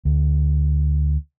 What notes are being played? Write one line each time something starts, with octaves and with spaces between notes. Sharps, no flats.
D2